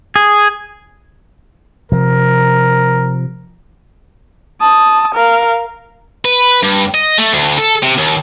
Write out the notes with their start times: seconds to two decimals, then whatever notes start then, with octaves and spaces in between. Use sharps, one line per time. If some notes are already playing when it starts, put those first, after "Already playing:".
0.16 G#4
1.92 C3 F3 A#4
4.61 A5 D#6
5.15 A#4 F5
6.25 B4
6.63 G2
6.94 D#5
7.18 A3
7.33 D2
7.58 A4
7.82 C3
7.97 D#2